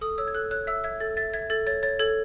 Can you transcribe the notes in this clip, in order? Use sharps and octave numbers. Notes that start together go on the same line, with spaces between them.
A4 D#6
C#5 E6
G#6
A4 F#6
C#5 F#6
E5 E6
E5 G#6
A4 A6
E5 A6
E5 G#6
A4 A6
C#5 A6
C#5 A6
A4 G#6